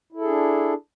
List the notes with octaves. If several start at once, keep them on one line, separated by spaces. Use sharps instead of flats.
D4 E4 G#4 A4